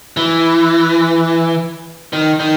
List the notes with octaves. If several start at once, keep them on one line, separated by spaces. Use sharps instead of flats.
E3
D#3
D#3